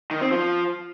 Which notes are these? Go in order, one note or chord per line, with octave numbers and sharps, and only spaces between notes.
D#3
C4
F3